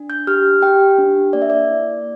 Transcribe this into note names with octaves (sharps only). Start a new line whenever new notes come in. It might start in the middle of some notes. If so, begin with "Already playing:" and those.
Already playing: D4
G6
G4 F6
G4 G5
D4
A#3 D5
E5
D5
E4